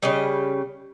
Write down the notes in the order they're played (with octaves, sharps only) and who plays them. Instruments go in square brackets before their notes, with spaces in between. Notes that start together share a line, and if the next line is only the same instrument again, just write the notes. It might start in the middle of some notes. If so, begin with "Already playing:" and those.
[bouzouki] C#3 G3 D#5